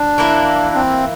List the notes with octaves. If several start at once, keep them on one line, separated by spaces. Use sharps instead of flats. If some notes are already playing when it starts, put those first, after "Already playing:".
Already playing: D4
E3 A#3 E4
C4